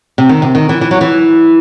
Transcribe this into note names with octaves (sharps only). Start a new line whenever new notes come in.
C3
D#3
C3
D#3
E3
E3
F#3
E3